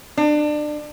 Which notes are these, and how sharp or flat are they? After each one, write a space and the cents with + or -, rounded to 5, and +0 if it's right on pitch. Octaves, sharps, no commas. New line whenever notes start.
D4 +25